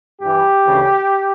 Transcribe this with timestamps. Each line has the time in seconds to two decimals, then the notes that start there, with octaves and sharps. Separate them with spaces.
0.21 G2 E3 G4
0.65 D2 C#3 E3